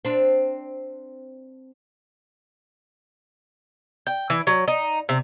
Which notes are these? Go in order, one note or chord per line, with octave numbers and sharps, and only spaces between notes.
C4 D4
G5
E3
F#3
D#4
C3